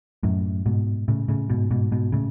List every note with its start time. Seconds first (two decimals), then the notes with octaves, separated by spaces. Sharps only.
0.23 F#2 A2
0.66 G#2 B2
1.08 A2 C#3
1.28 A2 C#3
1.49 G#2 B2
1.71 G#2 B2
1.92 G#2 B2
2.12 A2 C#3